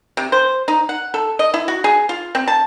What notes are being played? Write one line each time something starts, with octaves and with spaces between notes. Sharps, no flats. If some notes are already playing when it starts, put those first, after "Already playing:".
C3
C5
D#4
F#5
A4
D#5
E4
F#4
G#4
F4
C4
A5